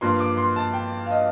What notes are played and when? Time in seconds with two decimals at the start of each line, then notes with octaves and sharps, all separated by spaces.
0.01 G2 F3 A#3 C6
0.20 D6
0.37 C6
0.56 A5
0.73 G5
1.06 F5
1.10 D#5